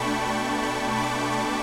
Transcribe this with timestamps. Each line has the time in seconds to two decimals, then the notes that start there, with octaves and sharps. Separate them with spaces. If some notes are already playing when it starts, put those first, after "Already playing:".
Already playing: B2 A3 D4 G5 A5 B5 C#6
0.28 G5 B5
0.62 G5 B5
0.97 B5 D6
1.33 C#6